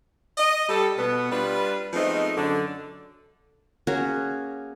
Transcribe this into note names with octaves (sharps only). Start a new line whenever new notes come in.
D#5
G3 A4
B2 B3
G3 D4 F4 B4
F3 G#3 A3 B3 C4 D#4
F#2 D3 D4
A#3 C#4 F#4 G#4